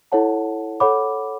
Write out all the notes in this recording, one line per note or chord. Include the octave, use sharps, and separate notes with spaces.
E4 A4 C#5 F#5 A5
A4 C#5 F#5 B5 D6